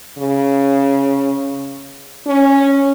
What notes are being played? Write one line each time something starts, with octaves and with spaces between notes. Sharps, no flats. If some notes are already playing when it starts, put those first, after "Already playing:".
C#3
C#4